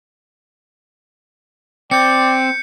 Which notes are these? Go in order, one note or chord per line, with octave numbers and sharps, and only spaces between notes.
C4 D5 G5 G6 C#7